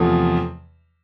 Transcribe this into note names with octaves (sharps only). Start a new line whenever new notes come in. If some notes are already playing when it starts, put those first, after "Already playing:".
Already playing: E2 C3 F3 A3